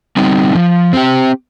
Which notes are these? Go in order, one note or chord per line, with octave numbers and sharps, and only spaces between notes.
G3 C4 D#4
F3
C4 G4